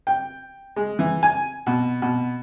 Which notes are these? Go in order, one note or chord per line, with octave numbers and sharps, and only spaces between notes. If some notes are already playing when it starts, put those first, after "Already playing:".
G5
G#3
E3
G#5
B2
B2